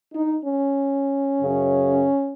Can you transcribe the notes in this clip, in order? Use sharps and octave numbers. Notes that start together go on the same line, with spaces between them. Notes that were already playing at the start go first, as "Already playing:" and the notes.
D#4
C#4
F#2 C#3